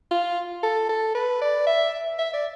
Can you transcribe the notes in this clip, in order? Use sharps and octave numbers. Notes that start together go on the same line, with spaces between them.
F4
A4
A4
B4
D5
E5
E5
D5